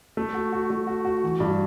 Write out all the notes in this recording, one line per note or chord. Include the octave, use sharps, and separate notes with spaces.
A3
F#4
F#4
A3
F#4
F#4
E3
G2